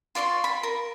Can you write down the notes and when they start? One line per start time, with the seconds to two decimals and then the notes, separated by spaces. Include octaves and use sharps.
0.15 F4 D5 C6 C#6
0.44 B5
0.63 A#4